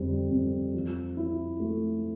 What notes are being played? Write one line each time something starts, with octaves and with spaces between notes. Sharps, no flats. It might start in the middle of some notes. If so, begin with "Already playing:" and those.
Already playing: F2 D3 G3
F2
F3
E4
A3